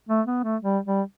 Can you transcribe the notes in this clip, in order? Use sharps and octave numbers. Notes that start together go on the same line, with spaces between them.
A3
B3
A3
G3
G3